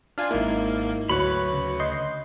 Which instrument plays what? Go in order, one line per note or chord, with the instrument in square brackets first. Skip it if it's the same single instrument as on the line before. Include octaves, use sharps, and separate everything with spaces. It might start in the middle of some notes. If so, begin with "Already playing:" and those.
[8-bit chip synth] D4 F4 G#5 [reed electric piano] F6
[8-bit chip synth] G#1 A#3 [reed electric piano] G#2 D#4 E4
[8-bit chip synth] D2 [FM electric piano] F#3 [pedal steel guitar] B4 C#5 B5
[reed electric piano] C#3
[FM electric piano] D#5 C6 G6